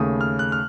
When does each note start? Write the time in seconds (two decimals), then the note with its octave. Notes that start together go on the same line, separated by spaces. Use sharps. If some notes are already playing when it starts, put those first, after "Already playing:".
Already playing: D#2 C#3 A3 D#6
0.21 F6
0.39 F#6
0.52 F6